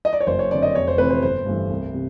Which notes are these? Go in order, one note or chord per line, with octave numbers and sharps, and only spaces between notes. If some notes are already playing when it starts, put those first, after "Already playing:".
D#5
D5
C#5
F#1 C5
C#5
F2 D3 D5
D#5
F1 C#5
C5
F2 C3 E3 A3 B4
C5
G1 C5
G2 E3 A3
C2
C3